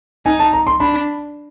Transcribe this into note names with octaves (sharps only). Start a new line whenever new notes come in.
D#4 G#5
A5
A#5
C6
D4 B5